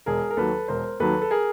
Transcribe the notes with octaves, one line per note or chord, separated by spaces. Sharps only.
E1 G#4 A#4
A#4
D#2 D#3 F#3 A4 B4
E1 A#4 C5
D#2 D#3 F#3 A4 B4
A4
G#4 A#4